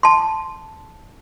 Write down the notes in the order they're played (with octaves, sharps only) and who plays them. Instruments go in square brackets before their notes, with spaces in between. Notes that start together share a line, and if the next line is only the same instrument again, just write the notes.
[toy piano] A5 C6